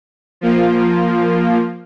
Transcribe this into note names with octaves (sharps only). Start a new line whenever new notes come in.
F3 A#3 F4